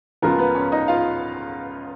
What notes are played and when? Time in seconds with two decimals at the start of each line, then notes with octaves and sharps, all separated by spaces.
0.22 C#2 C#3 F3 B3 F4 A#4
0.38 B3 B4
0.55 C#4 C#5
0.72 D#4 D#5
0.88 F4 F5